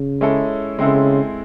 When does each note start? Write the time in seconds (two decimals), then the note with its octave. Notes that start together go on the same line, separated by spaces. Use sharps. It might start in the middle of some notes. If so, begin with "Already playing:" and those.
Already playing: C#3
0.21 G#3 C#4 E4 A4
0.79 C#3 G#3 C4 E4 A4